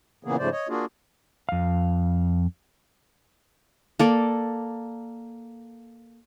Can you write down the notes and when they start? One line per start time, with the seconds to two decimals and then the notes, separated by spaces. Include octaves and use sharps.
0.24 A#2 C#3 E3 A#3 B3 G#4
0.39 G#2 C#3 F3 A3 C5 D5
0.52 C#5 D#5
0.69 A#3 D4 F4 F#4 G#4
1.49 F2 F5
3.99 A#3 A4 D5